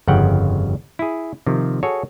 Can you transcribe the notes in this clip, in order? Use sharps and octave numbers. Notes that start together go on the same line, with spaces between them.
G1 F2 C#3 F#5 G5
E4 G#4
C3 D#3 F3
F#4 G#4 A4 C#5